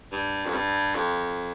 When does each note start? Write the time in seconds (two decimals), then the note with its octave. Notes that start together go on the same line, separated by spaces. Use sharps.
0.12 G2
0.46 F2
0.54 G2
0.95 F2